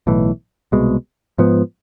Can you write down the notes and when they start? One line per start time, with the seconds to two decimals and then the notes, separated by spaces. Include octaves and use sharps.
0.07 B1 A2 E3
0.72 C2 B2 G#3
1.38 G#2 F3 B3